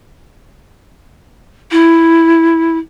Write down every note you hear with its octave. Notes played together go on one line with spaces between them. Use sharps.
E4